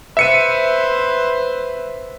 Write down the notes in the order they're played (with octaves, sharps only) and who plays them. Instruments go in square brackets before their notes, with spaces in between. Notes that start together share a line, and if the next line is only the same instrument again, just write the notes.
[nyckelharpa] B4 C5 [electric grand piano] E5 C#7 D#7